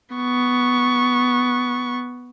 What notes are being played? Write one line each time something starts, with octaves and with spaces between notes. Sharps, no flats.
B3 C#6